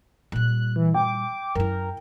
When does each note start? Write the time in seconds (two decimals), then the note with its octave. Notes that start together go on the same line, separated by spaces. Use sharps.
0.32 A#2 G3 F#6
0.76 E3
0.94 G5 D6
1.55 F#2 E4 A#4